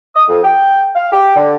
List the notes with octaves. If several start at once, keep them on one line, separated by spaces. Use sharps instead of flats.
D#6
F2
G5
F5
G4
D3